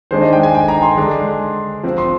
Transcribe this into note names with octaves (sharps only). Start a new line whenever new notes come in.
D#3 G#3 D4 C5
D#5
G5
G#5
G5
A#5
C6
D3 G#3 D4
F3 C4
C6